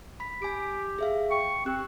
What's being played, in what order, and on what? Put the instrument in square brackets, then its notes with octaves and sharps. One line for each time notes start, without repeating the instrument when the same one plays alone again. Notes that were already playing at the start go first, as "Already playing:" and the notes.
[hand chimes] B5 B6
[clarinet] G4 [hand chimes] G#5 B6 D7
[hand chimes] G#4 E5 F5
[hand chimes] G5 [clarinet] C#6
[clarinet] C4 [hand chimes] G4 F#6